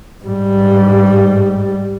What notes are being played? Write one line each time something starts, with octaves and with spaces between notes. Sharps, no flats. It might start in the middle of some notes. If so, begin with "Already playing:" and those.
G#2 G3